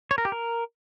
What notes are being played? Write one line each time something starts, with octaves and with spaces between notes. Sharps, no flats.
C#5
A#4
G4
A#4